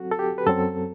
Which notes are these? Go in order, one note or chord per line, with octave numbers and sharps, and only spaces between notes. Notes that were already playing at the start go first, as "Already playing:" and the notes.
Already playing: F#3 C4 F#4 A4
A4
G4
B4
F#2 F#3 C4 A4